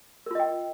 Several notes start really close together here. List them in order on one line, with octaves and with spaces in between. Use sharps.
A#4 F4 D#5 G5